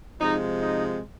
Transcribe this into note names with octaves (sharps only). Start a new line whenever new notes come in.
C3 F3 G#3 D#4
D#4